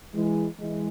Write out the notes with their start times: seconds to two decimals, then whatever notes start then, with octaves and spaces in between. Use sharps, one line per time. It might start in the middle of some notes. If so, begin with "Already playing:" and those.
0.14 E3 G#3
0.60 E3 G#3